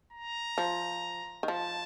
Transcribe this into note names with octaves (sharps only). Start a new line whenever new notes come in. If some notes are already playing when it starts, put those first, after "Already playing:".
A#5
F3
D#3
F3 A5